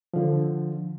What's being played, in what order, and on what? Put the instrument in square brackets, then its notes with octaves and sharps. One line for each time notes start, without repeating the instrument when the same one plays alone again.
[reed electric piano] D3 F3